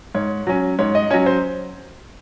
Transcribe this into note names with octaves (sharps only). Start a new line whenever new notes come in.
G#2 C#5
F#3 C#4
G#2 C#5
D#5
F#3 C#4 C#5
C5